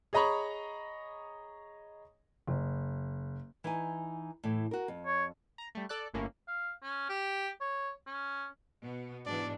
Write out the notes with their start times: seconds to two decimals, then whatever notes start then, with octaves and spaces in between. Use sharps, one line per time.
0.13 G#4 C#5 D#5 A#5 B5 C#6
2.48 F#1
3.64 E3 D#4 G#5
4.44 A2 E3
4.71 F#4 A#4
4.88 F2
5.06 C#5
5.58 A#5
5.75 G3 A3
5.89 A4 D5 F#6
6.14 G1 A2 A#3 C#4 E4
6.48 F5
6.82 C#4
7.09 G4
7.60 C#5
8.06 C#4
8.82 B2 B3
9.26 G#2 B2 E3 D4 D5